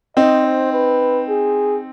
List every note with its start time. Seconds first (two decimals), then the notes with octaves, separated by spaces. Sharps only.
0.17 C4 D#4 D#5
0.45 C5
0.73 B4
1.29 G#4